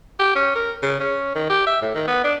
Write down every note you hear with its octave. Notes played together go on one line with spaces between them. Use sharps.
G4
C#4
A#4
C#3
C#4
D#3
G4
E5
A2
D#3
B3
D4